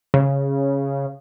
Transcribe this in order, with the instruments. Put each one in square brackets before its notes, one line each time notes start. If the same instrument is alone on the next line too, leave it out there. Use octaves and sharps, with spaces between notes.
[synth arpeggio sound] C#3